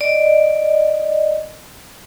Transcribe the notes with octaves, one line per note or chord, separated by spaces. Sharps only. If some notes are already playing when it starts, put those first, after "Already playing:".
D5 D#5